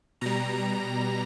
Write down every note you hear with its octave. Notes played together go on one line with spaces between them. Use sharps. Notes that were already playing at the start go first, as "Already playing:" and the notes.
B2 G3 A#5